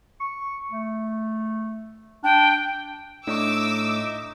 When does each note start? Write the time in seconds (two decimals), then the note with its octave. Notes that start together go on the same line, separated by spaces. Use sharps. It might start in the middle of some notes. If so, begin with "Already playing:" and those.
0.20 C#6
0.71 A3
2.24 D4 G5
3.27 A2 D4 D#4 D#5 E5 C#6 D6 E6